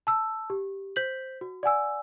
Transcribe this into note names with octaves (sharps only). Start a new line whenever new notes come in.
A5 E6
G4
C5 G6 B6 F#7
F#4
D5 F#5 G#5 E6